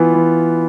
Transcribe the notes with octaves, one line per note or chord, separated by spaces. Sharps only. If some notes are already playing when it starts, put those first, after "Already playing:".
Already playing: E3 B3 F4
E3